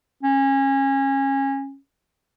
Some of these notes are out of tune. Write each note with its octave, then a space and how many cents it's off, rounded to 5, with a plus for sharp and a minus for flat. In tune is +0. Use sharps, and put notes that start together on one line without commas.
C#4 -25